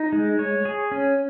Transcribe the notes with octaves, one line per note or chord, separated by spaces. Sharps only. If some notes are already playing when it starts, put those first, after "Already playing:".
Already playing: D#4
G#3
C#5
G#4
C#4